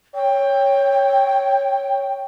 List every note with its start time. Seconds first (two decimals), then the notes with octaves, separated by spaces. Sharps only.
0.15 C#5 G5